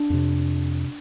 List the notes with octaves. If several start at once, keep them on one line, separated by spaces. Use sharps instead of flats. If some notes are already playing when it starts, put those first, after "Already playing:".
Already playing: D4
F2 C3